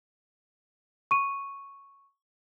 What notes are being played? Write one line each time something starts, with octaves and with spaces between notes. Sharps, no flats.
C#6 D#7